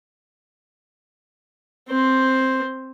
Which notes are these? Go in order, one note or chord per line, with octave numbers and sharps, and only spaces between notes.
C4 C5